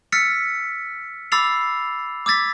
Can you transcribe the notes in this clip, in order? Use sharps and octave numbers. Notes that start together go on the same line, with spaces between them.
E6 F6 A6 B6 C#7
B5 D6 E6 A6 C7 F7
D6 E6 G#6 A6 B6